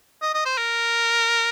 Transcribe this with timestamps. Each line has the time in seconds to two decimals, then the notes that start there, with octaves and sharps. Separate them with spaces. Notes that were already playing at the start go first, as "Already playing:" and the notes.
0.22 D#5
0.34 D#5
0.46 C5
0.58 A#4